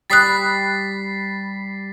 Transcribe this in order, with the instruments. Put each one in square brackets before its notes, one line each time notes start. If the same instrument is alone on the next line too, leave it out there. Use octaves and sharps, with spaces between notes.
[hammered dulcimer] G3 B5 [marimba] G5 D#6 F#6 [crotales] A6 B6 C7